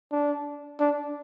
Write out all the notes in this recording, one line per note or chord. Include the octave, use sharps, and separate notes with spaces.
D4
D4